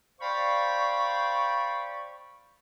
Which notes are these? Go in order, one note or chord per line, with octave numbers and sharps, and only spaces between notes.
C5 D5 F5 G5 B5 C#6